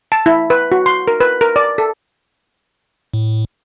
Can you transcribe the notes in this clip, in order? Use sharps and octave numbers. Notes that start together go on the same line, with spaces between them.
A5
E4
B4
F#4
C6
A#4
B4
A#4
D5
A4
A2